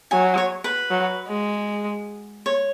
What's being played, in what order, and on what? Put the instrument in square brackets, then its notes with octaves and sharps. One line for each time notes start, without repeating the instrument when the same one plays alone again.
[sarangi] F#3 [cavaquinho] G#5
[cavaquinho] C#5
B4
[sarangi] F#3
G#3
[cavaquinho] C#5